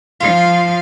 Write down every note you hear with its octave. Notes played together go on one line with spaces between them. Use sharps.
F3 F4 F5